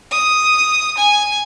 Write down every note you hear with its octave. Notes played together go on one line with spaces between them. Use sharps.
D#6
G#5